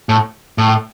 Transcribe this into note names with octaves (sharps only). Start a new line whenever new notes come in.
A2
A2